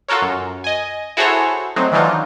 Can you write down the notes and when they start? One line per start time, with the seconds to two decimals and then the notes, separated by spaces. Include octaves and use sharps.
0.08 F4 F#4 A4 A#4 C#5
0.22 F#2
0.64 D#5 G#5
1.17 E4 F#4 G#4 A4 C5 C#5
1.76 F#3 A3 C4 D#4
1.92 D#3 E3 F#3 D4 D#4 F4